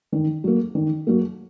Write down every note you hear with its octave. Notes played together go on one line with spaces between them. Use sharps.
D#3
F#3 A#3
D#3
F#3 A#3